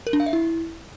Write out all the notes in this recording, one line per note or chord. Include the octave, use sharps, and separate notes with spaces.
A#4
D4
F5
E5
E4